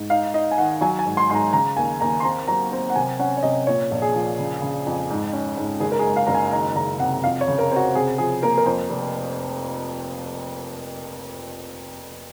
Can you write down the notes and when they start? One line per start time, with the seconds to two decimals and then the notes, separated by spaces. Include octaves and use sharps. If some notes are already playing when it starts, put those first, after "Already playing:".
Already playing: G#2
0.10 D#4 F5
0.34 D#4 D#5
0.51 G#5
0.58 D#3 F#5
0.81 F#3 G#5
0.99 G#5
1.06 G#2
1.17 C6
1.29 G#2 C6
1.35 A#5
1.53 C#3 A#5
1.77 D#2 G#5
2.00 D#2 A#5
2.20 C6
2.24 C4 A#5
2.48 F#3 A#5
2.72 C4
2.90 F#5
2.96 C3 G#5
3.19 C#4 F#5
3.37 C#5
3.43 C3 D#5
3.67 A#2 C#5
3.91 A#1
4.02 G#4
4.14 F3
4.39 C#3
4.62 C#3
4.86 F2
5.10 G#2
5.33 C#4
5.57 G#2
5.80 F#1 G#4
5.92 A#4
5.99 G#4
6.05 G#3
6.16 F5
6.26 F#1 A#5
6.35 G#5
6.52 D#3 A#5
6.75 F#1 A#5
6.99 C3 F#5
7.24 F2 F5
7.41 C#5
7.48 C#3
7.59 A#4
7.71 C4
7.76 F#4
7.95 C3 G#4
8.18 F3 G#4
8.42 A#3 A#4
8.58 A#4
8.66 F2 C5
8.90 F1